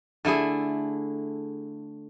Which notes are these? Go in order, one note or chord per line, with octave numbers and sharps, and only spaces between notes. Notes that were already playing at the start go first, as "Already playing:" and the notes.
D3 A3 E4 G#4